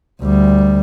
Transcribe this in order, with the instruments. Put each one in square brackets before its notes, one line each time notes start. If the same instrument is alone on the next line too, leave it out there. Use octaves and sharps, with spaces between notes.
[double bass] D2 G3